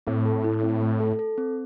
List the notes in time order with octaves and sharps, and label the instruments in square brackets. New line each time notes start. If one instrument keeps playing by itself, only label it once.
[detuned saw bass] A2 [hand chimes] C4
[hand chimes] A4
E4
C4
A3
A4
A4
C4